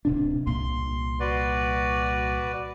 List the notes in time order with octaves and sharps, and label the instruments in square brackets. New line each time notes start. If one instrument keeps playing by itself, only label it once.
[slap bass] D1 C3 D4
[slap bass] C2 A#2 [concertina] C6
[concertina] F#4 B4 D5